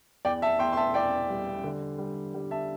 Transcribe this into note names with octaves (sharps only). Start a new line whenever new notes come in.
E2 D5 G5
E5 A5
E2 G5 C6
C6
E5 A5
E2 D5 G5
G3
D3
G3
G3
E5 A5